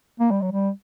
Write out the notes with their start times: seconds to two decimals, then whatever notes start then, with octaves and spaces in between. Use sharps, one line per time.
0.20 A#3
0.31 G3
0.42 F#3
0.52 G3